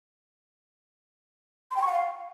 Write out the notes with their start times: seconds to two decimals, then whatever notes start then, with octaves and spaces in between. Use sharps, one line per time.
1.71 C6
1.76 G5
1.81 C#6
1.87 F#5
1.92 F5